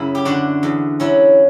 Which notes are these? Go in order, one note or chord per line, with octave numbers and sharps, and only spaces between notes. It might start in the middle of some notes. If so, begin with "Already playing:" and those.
Already playing: F#2 C#3 E4
G4
D3 D4 F#4
E2
F#3 C#4 E4